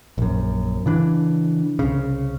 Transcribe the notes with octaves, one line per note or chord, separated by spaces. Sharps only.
A#1 F#2
C#3 E3 D4
C2 C#3